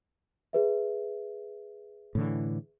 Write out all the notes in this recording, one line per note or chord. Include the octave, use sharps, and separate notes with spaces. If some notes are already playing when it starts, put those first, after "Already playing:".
G#4 B4 E5
A2 D3 E3